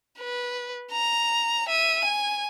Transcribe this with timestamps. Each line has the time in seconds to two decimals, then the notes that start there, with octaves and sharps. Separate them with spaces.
0.19 B4
0.92 A#5
1.68 E5 D#7
2.04 G#5